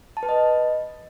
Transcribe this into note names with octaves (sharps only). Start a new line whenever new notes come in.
A5
B4
D#5